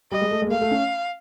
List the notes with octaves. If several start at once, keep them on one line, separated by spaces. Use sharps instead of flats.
G3 D#5
G#3
A3
G#3 A#3
A3 F5
A3
C#4